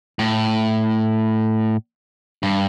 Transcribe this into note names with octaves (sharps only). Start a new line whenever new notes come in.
A2
G2